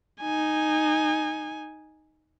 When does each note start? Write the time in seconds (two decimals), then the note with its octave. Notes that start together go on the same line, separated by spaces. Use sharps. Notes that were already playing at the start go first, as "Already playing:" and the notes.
0.21 D#4 G#5